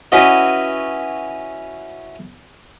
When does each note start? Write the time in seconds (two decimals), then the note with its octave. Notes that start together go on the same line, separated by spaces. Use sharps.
0.12 C#4 E4 F#4 B4 D#5